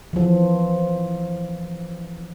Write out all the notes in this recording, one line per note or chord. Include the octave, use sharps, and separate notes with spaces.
E3 F3